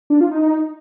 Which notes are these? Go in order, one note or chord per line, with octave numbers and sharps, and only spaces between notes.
D4
F4
D#4